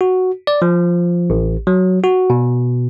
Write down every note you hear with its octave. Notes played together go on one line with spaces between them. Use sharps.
F#4
D5
F3
A1
F#3
F#4
B2